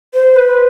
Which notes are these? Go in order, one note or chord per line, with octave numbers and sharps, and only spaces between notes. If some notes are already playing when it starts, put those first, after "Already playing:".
C5
B4